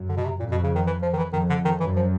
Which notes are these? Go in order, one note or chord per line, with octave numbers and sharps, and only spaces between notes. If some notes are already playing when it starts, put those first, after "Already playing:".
Already playing: F#2
D3
B2
C3
F2 A#2
B2
C#3
D#3
E3
F3
D#3
E3
F2 D#3
D3
D#3
F#2 E3
F3